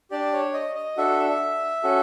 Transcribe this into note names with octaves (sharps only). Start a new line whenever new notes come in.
D4 G4 D5
C#5
D#5
D#5
D4 F#4 A4 E5
C#4 F#4 A4